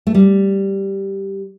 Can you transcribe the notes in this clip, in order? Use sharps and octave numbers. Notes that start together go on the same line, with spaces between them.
A3
G3